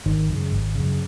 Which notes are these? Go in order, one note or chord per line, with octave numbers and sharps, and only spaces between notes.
G#1 D#3
F#2 C#3
G#1
F#2 C#3